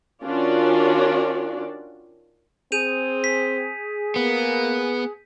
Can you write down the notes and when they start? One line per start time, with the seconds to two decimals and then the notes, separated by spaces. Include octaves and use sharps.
0.23 D#3 C#4 D4 F4 F#4 D5
2.72 C4 G#4 G6 D#7 F7
3.24 B6
4.16 A#3 B3